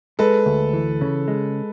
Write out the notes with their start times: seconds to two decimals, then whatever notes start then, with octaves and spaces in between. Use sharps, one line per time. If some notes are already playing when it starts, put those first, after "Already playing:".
0.19 G#3 A4 B4
0.46 D2
0.73 E3
1.01 C#3
1.28 G#3